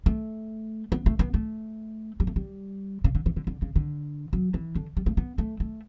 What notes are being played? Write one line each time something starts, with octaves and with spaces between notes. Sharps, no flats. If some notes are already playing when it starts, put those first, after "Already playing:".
A3
B3
A3
B3
A3
G3
A3
G3
C#3
D3
E3
D3
D3
C#3
D3
F#3
E3
D3
G3
A3
B3
A3
A3